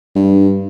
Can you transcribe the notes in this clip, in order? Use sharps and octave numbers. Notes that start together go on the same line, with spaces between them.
G2